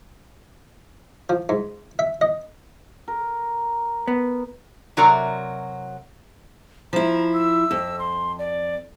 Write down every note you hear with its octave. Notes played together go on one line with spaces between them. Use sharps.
F3
G#2
E5
D#5
A#4
B3
C3 F#3 F#4 A#4 D5 A#5
F3 E4 A#5
E6
F2
C6
D5